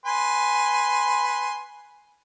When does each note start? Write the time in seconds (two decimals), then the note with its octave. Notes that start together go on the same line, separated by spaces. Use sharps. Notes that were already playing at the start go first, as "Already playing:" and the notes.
0.06 B4 G#5 C6